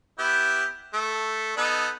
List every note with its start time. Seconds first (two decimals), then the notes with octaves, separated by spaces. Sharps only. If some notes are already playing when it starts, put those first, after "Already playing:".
0.19 B3 E4 G4
0.93 A3
1.57 B3 D#4 A4